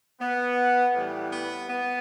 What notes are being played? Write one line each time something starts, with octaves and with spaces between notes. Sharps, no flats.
B3
A2 E3 G3
B3
B3